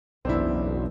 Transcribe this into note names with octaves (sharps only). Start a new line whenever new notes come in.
F#1 B1 E2 C4 D4 E4